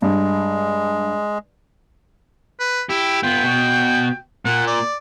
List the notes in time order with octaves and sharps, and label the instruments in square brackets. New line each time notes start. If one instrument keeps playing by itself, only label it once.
[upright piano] G2 [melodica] G#3
[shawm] B4
[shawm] E4 [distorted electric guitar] G4
[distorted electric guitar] B3 F4 [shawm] G5
[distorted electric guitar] B2 F#4
[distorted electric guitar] A#2 [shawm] F#5
[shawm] D5